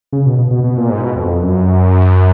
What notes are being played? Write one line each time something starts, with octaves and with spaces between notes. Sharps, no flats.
C#3
B2
B2
B2
B2
A#2
G#2
B2
F2
F#2